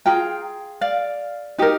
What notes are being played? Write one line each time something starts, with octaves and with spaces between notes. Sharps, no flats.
F4 G#4 G5 A#5
D5 F5
D#4 G4 A#4